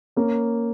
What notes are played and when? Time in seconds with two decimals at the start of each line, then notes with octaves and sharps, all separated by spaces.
0.16 A#3 C#4